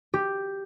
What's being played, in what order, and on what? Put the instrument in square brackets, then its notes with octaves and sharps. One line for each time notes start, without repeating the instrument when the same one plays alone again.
[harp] G4